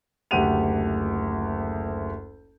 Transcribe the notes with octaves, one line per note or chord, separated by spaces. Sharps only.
F#1 D2 G4 F#5 D#7 F7